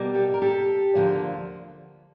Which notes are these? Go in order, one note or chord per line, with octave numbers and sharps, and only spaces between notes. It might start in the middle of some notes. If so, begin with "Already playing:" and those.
Already playing: B2 G3 A#3
G4 A4
A#4
G4 A4
D2 D3 F3 A#3